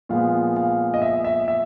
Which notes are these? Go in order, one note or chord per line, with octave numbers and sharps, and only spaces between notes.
A#2 F3 G#3 B3 F5
F5
D#5
E5
E5
E5